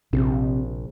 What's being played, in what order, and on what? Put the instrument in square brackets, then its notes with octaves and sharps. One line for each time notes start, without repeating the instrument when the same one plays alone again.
[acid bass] A#1 [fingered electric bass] C3